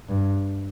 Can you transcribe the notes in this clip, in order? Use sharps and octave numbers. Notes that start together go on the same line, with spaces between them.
G2